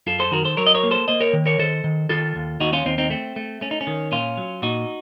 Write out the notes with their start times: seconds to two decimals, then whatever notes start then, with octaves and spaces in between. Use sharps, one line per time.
0.07 F#2 F4 A4
0.19 A4 C5
0.31 D#3 F#4 A#4
0.44 A4 C5
0.57 F#3 A#4 C#5
0.67 D#5
0.75 A#4 C#5
0.83 A#3
0.91 A4 C5
1.08 A#3 C5 D#5
1.21 A#4 C#5
1.33 D#3
1.46 A#4 C#5
1.59 D#3 A4 C5
1.84 D#3
2.09 D#3 F4 A4
2.35 D#2
2.60 D#2 D#4 F#4
2.73 C#4 F4
2.85 D#2 C4 D#4
2.98 C4 D#4
3.10 A3 C4
3.36 A3
3.61 A3 C#4
3.71 D#4
3.81 C#4
3.87 D#3
4.12 A#2 C#4 F4
4.38 F#3
4.62 A#2 D#4 F#4